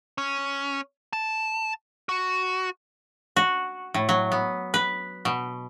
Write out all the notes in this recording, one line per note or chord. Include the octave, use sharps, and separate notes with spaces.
C#4
A5
F#4
F#4
A2
F#3
B3
B4
B2